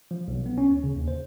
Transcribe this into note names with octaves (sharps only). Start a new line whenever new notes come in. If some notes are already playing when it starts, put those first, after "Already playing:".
F3
B1
B3
C#4
D2
C#3
D#2
C5